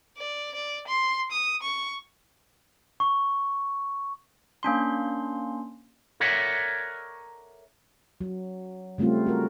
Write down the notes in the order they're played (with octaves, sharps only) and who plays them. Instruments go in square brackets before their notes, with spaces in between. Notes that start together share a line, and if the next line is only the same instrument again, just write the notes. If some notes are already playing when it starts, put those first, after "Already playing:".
[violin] D5
D5
C6
D#6
C#6
[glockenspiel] C#6
[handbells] A#3 C#4 D4 C6
[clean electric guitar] A4 A#4 C#5 D5 E5 F#5
[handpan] F#3
C#3 G3 A3 C4 F4
F#4 A#4